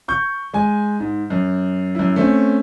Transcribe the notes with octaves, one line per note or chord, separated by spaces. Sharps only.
C#6 G6
G#3 G#5
G#2
F#2
F#2 E4
A3 C4 C#4